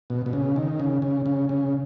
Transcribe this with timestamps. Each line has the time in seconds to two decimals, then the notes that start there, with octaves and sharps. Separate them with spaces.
0.10 B2
0.26 B2
0.33 C#3
0.56 D#3
0.80 C#3
1.02 C#3
1.26 C#3
1.49 C#3